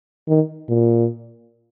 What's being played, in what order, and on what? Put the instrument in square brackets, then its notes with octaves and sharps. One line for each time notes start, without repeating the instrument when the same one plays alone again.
[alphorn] D#3
A#2